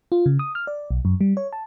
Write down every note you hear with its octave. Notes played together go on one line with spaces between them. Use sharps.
F4
C#3
D#6
F6
D5
B1
F#2
G3
C#5
A5